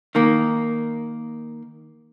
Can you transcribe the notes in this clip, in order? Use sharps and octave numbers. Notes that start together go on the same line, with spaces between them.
D#3 A#3